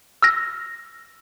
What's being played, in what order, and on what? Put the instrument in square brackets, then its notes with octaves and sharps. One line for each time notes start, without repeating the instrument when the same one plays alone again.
[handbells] E6 F6 A#6